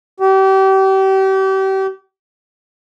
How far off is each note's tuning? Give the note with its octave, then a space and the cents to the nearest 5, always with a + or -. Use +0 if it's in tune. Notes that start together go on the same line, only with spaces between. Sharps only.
G4 -35